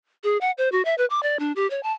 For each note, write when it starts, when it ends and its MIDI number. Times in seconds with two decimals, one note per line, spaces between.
0.24 0.37 68
0.41 0.51 78
0.58 0.69 72
0.72 0.82 66
0.85 0.95 76
0.98 1.05 71
1.10 1.22 86
1.23 1.37 74
1.39 1.52 62
1.56 1.69 67
1.70 1.82 73
1.83 1.92 81